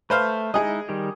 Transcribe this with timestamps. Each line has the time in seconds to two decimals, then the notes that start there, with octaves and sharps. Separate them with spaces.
0.10 A3 B4 C5 F5
0.54 G#3 D#4 E4 G#4 D#5
0.89 D#3 G3 G4